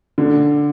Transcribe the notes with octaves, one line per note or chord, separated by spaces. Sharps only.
D3